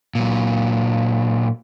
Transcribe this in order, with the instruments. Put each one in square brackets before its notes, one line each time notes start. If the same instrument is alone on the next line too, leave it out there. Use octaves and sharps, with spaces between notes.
[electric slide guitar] A#2 F#3